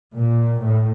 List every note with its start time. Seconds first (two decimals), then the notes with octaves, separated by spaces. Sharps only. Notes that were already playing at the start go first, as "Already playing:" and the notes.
0.15 A#2
0.62 A2